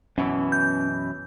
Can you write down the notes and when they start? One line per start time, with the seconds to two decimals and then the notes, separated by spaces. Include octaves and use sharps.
0.18 F#2 B2 E3 C#4
0.52 G6